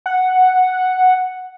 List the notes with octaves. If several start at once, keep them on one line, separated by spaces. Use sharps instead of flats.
F#5